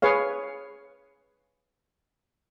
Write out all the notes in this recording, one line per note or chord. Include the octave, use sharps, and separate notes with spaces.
G#4 B4 C#5 F5